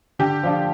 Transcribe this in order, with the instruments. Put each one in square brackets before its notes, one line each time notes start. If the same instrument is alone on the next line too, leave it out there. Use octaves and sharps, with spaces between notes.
[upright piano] D3 [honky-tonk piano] G4
[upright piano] F3 D4 F4